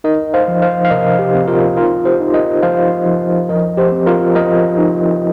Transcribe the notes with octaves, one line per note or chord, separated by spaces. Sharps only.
D#4 A#4 D#5
C5 F5
F3
C5 F5
F5
C3 A#4 D#5
G4
C4
F4 A#4
D#4 F4 A#4
G4 C5
D#4
A#4 D#5
F3 C5 F5
F3
F3 A#4 D#5
G4 C5
C4
F4 A#4
F3 A#4 D#5
D#4